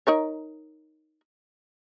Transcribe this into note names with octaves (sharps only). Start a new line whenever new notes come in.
D#4 A#4 C#5